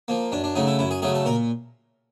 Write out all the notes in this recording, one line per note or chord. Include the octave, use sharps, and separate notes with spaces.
F3 A#3
F#2 D4
D4
C#3 F#3 A3 D#4
E4
F#2 E4
G#4
C#3 F#3 A3 G#4
A4
A#2 A#4